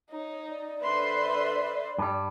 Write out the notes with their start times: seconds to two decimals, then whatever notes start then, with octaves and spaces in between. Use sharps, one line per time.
0.11 D#4 C#5
0.50 D5
0.82 D3 B4 C5 E5 C6
1.98 G2 G3